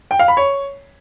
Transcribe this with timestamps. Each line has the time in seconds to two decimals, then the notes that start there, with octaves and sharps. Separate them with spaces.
0.11 G5
0.19 F5
0.28 B5
0.37 C#5